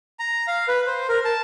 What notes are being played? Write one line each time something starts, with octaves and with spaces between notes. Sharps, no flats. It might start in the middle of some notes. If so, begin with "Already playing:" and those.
A#5
F5
B4
C5
A#4
A5